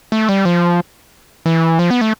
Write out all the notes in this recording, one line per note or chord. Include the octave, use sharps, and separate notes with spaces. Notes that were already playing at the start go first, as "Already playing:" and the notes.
A3
G3
F3
E3
F3
B3
A3